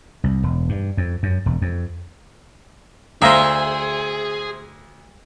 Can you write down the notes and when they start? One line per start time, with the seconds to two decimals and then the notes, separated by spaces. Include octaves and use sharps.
0.24 C2
0.43 E1
0.69 G2
0.97 F2
1.23 F#2
1.46 E1
1.62 F2
3.22 D2 G#4 C5 E5 F5 A#5 D#6